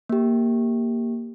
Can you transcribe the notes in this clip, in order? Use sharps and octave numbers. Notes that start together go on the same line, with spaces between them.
A#3 G4